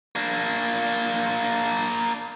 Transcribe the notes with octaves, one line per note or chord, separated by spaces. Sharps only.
A#3 D4